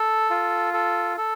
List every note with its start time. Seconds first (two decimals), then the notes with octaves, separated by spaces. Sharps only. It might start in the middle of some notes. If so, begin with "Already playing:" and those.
Already playing: A4
0.30 F4
0.74 A4
1.17 A4